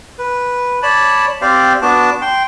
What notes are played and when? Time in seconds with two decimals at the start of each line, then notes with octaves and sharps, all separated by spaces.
0.19 B4
0.83 C#5 D5 A5 B5
1.42 C4 G4 C5 D5 F5
1.82 B3 D4 F#4 A5 D6
2.22 G5 C6